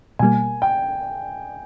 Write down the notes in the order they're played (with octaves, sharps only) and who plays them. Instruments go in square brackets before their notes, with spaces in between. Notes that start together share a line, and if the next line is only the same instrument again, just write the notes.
[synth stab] B2 G3 A#3 [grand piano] G#5
[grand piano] G5